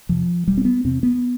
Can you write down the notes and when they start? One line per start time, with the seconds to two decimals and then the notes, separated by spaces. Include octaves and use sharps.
0.09 E2 C3 F3
0.47 E1 G3
0.58 C4
0.65 B3
0.84 E2 C3 C4
1.03 B3